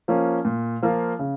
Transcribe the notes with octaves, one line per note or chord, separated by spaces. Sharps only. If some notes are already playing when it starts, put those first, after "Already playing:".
F3 A#3 C#4
A#2
F3 A#3 F4
C#3